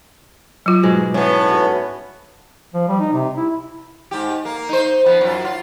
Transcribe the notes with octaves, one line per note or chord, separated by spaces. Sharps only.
F#3 F4
G#2 B2 G#3
A2 B3 C#4
C#4 F#4
F3
G3
D#4
C3
E4
G#2 G4
A#3
D#4 C5
F3 B3
F#2 F4
F4